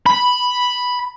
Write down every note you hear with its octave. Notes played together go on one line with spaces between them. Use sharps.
B5